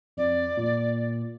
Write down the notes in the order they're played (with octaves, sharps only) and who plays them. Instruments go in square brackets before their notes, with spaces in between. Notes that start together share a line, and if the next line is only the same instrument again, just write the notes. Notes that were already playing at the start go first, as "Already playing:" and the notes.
[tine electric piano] F2 [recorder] D5
[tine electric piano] A#2